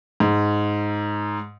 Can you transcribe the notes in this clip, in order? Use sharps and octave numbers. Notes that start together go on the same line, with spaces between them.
G#2